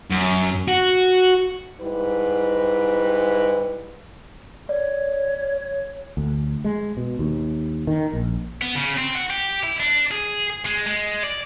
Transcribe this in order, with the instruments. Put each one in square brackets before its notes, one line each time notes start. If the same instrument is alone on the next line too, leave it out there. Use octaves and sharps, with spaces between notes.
[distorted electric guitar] F#2
F#4
[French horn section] G#2 G3 E4 B4
[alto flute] C#5 [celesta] D5
[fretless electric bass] D2
G#3
B2
D#2
D#3
A#1
[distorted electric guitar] B3
C#3
C4
F#4
G4
E4
D4
G#4
G#3
G#3
D5